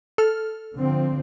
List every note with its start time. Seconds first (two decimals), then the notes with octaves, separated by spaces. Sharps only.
0.18 A4 F6
0.75 D3 F3 C4